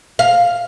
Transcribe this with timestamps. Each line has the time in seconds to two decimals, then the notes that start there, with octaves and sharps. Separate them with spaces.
0.19 F5